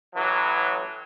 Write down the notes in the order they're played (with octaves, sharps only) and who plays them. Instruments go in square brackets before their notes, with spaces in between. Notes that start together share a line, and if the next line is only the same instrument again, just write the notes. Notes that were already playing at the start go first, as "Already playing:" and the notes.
[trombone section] A1 E3 F#3